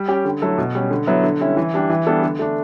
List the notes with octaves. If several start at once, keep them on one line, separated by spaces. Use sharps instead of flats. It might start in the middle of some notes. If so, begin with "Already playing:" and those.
Already playing: G3
C#4 G4
D3
F#3 A3 E4 A4
B2
G3 C#4
D3
F#3 B3 E4
D3
G3 C#4 E4
E3
G3 D4 G4
E3
G3 B3 D4 A4
D3
A3 D4